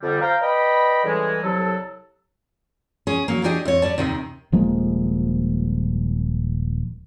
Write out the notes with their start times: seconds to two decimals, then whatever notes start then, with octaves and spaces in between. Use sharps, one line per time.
0.02 F2 D3 G3
0.20 C5 F5 G5 A#5
0.41 B4 D5 D#5 G5 B5
1.04 A2 C#3 E3 G3 G#3
1.42 C2 F#3 A4
3.07 C#4 G#4
3.28 F#3 A#3
3.43 F#3 D4 G4 G#4 D#5
3.65 F2 C#5
3.82 G3 D5 A5
3.98 D#2 C3 D#3
4.52 D#1 F3 G#3 A#3